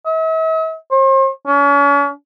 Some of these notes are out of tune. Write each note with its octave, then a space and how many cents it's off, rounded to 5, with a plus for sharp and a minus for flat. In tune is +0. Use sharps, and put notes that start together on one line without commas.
E5 -45
C5 +40
C#4 +40